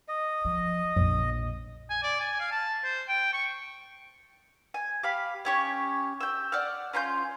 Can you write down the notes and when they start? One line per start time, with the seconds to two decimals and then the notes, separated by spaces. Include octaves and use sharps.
0.08 D#5
0.45 F3
0.96 A#1 F2
1.90 G#5
2.03 D5
2.20 G#5
2.40 F5
2.51 A5
2.84 C5
3.08 G5
3.33 C#6
4.74 G#5
5.03 G4 F5 B5
5.45 C#4 G4 C#5
6.20 G5 E6
6.52 D5 F#5 F6
6.93 C#4 F4 C6 G6